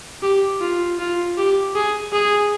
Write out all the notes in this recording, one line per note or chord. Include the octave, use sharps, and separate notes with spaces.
G4
F4
F4
G4
G#4
G#4